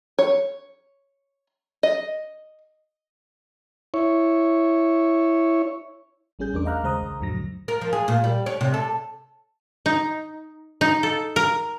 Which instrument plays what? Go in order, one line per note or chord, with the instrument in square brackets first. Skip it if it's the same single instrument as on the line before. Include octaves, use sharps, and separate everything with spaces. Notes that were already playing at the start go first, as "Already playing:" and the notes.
[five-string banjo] C#5
D#5
[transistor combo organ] E4 C#5
[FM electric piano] A1 G3 C#4 G#4 G6
E2 A3 D4 A#4 D6
D#5 F5 A#5 F6 F#6
D#2 C#3 G#3 C5 A#5 D#6
B1
C2 F2 A2 D3 F#3 A#6
[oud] A#4
F3
G#4
A#2
G3
C#4
C3
A4
[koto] D#4
D#4
A4
A#4